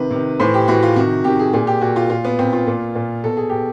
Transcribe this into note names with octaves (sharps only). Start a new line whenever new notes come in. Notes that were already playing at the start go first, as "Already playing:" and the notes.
Already playing: C3 D#3 B4
C3 D#3
A2 E3 C5
G4
A2 E3 F#4
F4
C3 D#3 F#4
C3 D#3 G4
G#4
A#2 G#4
G4
A#2 F#4
F4
A#2 F4
B3
A#2 C4
F4
A#2
A#2
B2 A4
G#4
B2 G4